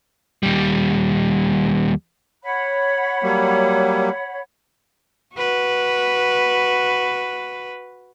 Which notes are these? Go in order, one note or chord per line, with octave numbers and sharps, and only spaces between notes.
D#2 G3
C#5 F#5 B5
F#3 G3 A#3
F#4 B4